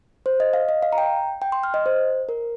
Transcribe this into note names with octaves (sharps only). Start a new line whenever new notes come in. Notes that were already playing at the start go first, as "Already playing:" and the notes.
C5
D#5
F5
D#5
F5
A#5
G5
G5
C6
F6
D#5
C5
A#4